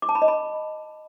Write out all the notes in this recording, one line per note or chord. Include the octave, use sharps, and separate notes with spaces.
D6
A5
B5
D#5
B5